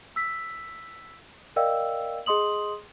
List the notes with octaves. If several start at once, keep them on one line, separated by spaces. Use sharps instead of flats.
E6 B6
A#4 D5 D#5 F5 G5 E6
G#4 D#5 C6 D#6 F#7